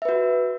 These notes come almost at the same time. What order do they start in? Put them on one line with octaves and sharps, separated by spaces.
E5 B4 F#4